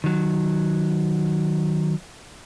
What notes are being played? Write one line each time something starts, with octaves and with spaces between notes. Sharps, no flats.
D#3 F#3